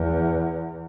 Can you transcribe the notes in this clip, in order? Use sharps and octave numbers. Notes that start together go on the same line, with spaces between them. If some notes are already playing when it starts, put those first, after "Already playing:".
Already playing: E2